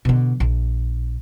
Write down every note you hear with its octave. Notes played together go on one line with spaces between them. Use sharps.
B2 D3
A#1